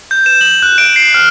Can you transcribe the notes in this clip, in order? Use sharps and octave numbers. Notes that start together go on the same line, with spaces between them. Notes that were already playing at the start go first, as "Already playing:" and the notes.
G6
E7
F#7
F#6
D7
C7
F6